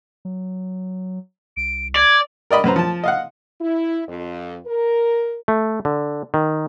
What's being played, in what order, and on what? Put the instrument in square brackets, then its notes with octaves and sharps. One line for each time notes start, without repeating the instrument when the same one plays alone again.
[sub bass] F#3
[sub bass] C2 [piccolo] D7
[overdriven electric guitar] D5 [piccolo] G#6
[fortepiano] A#4 D5 D#5 B5
F#2 B4 C5 A#5
F3 A5
D#5 F5 F#5
[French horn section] E4
F2
A#4
[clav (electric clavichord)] A3
D3
D#3